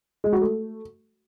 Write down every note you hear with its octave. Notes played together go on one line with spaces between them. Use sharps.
G#3
F#4
A3